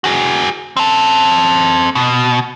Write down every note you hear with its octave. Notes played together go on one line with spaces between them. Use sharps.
F#4 G#4
C4 A5
B2